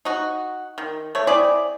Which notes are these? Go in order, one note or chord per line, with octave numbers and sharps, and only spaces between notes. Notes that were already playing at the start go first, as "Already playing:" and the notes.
D#4 F#4
D#3
A3 C#5
C4 E4 G#4 D5